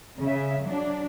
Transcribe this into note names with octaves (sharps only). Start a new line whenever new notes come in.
C#3 E5
F#3 D4